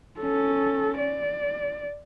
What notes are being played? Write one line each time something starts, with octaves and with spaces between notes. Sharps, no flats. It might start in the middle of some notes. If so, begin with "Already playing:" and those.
C#4 A4
D5